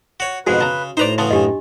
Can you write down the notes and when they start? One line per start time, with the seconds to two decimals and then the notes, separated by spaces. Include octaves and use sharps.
0.20 F#4 C#5
0.47 F2 G#2 B2 F#4 G#4 B4
0.61 C#3 A5 A#5
0.97 A2 D#4 B4 C5 D5 A#5
1.18 C#3 E3 B3 A5 C6
1.31 F#2 D4 G4 D#5